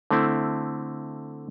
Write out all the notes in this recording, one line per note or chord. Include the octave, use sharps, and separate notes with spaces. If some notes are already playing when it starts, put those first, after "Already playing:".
D3 A3 C4 E4